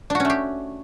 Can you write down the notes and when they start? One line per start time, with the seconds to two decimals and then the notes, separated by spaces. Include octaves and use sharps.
0.10 D4
0.15 F#4
0.20 C#4
0.25 A3
0.30 G4